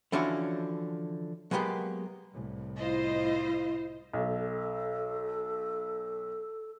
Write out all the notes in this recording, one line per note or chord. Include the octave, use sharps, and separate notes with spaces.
D3 E3 F3 C#4 D4 F#4
F#3 G#3 A#3 B3 G4
C2 A2
E4 F4 C5 D#5
B1 A4